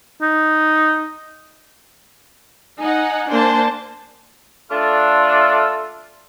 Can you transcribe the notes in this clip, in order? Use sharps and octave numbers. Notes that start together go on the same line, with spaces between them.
D#4
D#4 F#5 G#5
A#3 D4 C5 A5
A3 D4 F4 A4